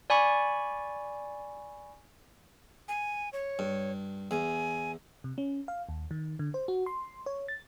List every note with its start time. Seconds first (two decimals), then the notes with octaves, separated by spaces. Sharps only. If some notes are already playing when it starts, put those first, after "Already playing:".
0.10 D5 G#5 B5 C#6
2.88 G#5
3.33 C#5
3.59 G2
4.31 E2 G#5
5.24 C3
5.38 C#4
5.68 F5
5.89 D#2
6.11 D#3
6.39 D3
6.54 C5
6.68 F#4
6.86 C6
7.26 C#5
7.48 A6